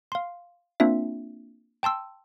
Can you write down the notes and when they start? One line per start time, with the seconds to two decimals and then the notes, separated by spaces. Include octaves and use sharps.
0.12 F5 C6
0.80 A#3 C4 D4 F4 E5
1.83 G5 A5 C6 E6